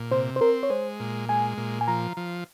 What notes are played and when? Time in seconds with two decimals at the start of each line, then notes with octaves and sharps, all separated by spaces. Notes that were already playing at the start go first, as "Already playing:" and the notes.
Already playing: A#2
0.11 C3 C5
0.36 C5
0.41 C4 A#4
0.63 C#5
0.70 G#3 C5
1.00 A#2
1.29 G#3 G#5
1.58 A#2
1.81 G#5
1.88 F3 A#5
2.17 F3